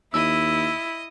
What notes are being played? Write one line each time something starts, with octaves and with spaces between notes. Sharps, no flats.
D#2 E4 D#5 E6